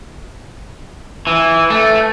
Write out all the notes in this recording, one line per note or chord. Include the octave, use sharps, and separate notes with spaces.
E3
A3